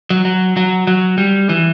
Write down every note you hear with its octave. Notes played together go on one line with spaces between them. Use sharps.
F#3
F#3
F#3
F#3
G3
E3